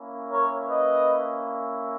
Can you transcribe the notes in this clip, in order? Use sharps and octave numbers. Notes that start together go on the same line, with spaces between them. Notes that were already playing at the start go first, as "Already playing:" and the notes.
Already playing: A#3 C#4 E4
A#4 C#5
B4 D#5